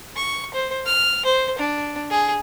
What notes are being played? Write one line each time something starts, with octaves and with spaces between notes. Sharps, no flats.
C#6
C5
F6
C5
D4
G#4